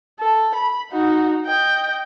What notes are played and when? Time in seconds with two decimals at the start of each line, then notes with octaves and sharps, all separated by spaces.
0.20 A4
0.55 B5
0.92 D#4 F#4
1.46 D#5 G5